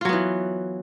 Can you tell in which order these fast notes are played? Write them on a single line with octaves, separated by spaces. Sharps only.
F4 F#3 B3 E3